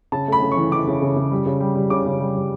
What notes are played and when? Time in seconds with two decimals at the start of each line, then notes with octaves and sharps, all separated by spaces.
0.12 C#3 A5
0.28 A3 B5
0.42 C#3
0.52 C#6
0.57 E3
0.72 E3 D6
0.87 C#3
1.02 C#3
1.16 C#3
1.31 G3
1.46 C#3
1.60 G3
1.75 G3
1.90 C#3 D6
2.06 C#3
2.20 G3
2.35 G3